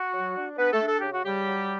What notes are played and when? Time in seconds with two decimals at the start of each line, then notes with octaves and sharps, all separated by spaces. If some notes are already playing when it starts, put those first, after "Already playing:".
Already playing: F#4
0.14 F#3
0.36 D4
0.58 B3 D4 B4
0.73 A3 A4
0.81 D4
0.88 A4
1.00 C#3 G4
1.13 F#4
1.24 C#3 G3 G4
1.46 F#3